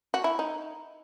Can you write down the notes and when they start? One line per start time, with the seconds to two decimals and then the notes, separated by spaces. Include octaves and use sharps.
0.14 F#4
0.24 E4
0.39 D#4